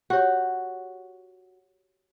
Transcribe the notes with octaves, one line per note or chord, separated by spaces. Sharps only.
F#4 G4 C#5